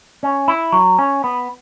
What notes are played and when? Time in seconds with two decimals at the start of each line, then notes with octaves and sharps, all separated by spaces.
0.23 C#4
0.48 E4
0.72 F#3
0.99 C#4
1.24 B3